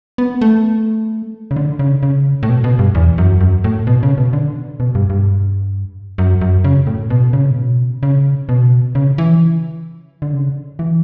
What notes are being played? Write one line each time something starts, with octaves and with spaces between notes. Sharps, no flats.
B3
A3
C#3
D3
C#3
C#3
A2
B2
B2
G2
E2
F#2
F#2
A2
B2
C#3
B2
D3
B2
G2
G2
F#2
F#2
C#3
A2
B2
C#3
A2
B2
C#3
B2
C#3
E3
D3
C#3
E3